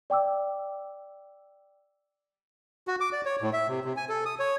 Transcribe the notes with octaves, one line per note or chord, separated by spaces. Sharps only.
D5 G5 D6 E6
F#4
D6
D5
C#5
A2
E5
C3
C3
G#5
A4
D#6
C#5